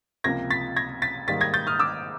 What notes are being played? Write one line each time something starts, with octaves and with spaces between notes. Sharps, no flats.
C#2 C3 F3 A#3 G#6 A#6
A6 B6
G#6 A#6
A6 B6
G#2 D#3 G3 A#3 A6 B6
G#6 A#6
G6 A6
D#6 F6
D6 E6